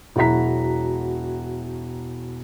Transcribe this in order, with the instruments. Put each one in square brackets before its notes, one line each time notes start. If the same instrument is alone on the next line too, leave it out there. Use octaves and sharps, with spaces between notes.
[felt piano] E1 F#3 E4 F#4 A#5 B6